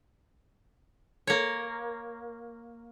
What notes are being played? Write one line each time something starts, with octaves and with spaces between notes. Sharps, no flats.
A#3 C#5